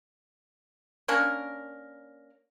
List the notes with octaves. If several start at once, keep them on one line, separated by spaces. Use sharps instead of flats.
A#3 C#4 D4 A#4